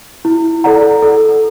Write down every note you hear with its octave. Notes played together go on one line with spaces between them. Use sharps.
E4
A4 D5 F#5 A#5
A4